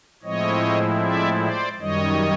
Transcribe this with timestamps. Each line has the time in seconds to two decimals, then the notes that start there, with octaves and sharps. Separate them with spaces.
0.23 A2 F3 G#3 C4 E4 C#5 D#5
1.02 D5 E5
1.41 C5 D5
1.79 F#2 D#3 G3 C#5 D#5